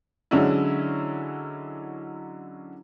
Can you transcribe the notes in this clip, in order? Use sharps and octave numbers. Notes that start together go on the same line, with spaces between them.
D3 F#3 G#3 C#4 D4 E4